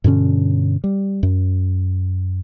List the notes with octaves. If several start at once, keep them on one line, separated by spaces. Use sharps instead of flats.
G2 B2 D3 C#4
G3
F#2